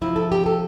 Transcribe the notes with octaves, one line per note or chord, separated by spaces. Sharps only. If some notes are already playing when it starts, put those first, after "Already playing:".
C3 F3 C4 E4
A4
G4
A4